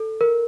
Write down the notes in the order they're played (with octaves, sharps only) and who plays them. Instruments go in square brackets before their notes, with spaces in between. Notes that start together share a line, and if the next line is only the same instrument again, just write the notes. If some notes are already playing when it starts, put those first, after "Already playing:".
Already playing: [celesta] A4
A#4